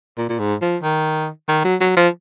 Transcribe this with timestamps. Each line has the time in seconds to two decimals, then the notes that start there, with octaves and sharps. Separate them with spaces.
0.18 A#2
0.29 A#2
0.39 G#2
0.62 F3
0.83 D#3
1.48 D#3
1.64 F#3
1.81 F#3
1.97 F3